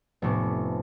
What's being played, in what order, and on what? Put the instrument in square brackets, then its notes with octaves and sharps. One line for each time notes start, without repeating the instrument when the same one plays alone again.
[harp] F1 A2 C3 A3 B3 D6